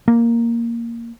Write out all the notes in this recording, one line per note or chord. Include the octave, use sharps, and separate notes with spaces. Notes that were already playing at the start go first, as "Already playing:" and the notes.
A#3